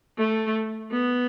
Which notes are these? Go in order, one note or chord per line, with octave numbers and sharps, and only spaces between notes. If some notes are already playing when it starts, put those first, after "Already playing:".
A3
B3